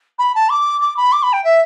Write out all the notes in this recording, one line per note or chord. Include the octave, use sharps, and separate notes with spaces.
B5
A5
D6
D6
B5
D6
B5
G5
E5